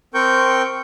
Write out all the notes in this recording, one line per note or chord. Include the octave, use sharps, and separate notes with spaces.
C4 A#4 G5 C#6 G6